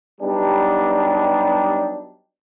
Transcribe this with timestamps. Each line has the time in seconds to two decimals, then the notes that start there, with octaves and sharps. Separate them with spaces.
0.21 F#3 G3 B3 D4 D#4 G4